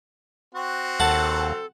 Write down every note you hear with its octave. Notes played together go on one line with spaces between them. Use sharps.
C4 F#4
D#2 A4 F#5 A5